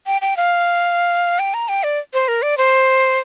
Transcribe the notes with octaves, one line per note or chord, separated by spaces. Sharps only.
G5
G5
F5
G5
A#5
G5
D5
C5
A#4
D5
C5